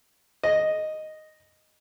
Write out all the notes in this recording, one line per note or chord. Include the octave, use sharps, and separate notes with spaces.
D#5